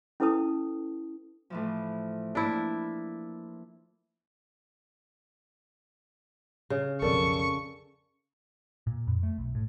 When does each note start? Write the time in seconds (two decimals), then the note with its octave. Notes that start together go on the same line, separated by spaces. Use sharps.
0.20 C#4 E4 A4 B4 A5 D#6
1.50 A2 E3 F3
2.35 A#3 D4 E4
6.70 C#3
7.02 B1 F2 A4 A#4 D5 C#6
8.87 A#2
9.07 F2
9.23 A3
9.38 B1
9.55 A2